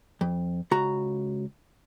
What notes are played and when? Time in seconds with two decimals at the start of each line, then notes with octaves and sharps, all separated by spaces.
0.21 F2
0.71 C#2 F#4 A#5